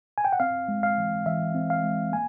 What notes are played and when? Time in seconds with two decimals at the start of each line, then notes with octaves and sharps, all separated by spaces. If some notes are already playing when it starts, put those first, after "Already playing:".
0.18 G#5
0.25 G5
0.33 F#5
0.40 C4 F5
0.68 G#3
0.83 F5
0.98 E3
1.26 E3 E5
1.55 C4
1.70 F5
1.84 G#3
2.12 A#3 G#5